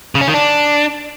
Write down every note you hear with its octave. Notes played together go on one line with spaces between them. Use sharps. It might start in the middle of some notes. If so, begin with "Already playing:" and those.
C#3
C#4
D#3
D4